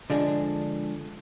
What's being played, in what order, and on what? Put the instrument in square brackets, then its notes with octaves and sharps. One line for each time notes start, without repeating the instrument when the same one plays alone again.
[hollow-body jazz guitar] D3 F3 G#3 D4 G#4